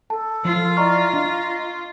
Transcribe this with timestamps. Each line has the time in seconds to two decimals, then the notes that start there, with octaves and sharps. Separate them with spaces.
0.10 A4 A5
0.45 F3 F4
0.77 E4 D5 D#5 A#5 C#6 F6
1.13 D4 D#5